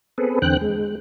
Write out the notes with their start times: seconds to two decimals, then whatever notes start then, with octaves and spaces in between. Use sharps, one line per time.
0.18 B3 C4 G#4 A4 B4
0.42 E2 D3 C4 G5 F#6
0.61 G#3